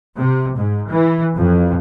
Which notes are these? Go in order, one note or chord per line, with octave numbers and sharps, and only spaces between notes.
C3
G#2
E3
F2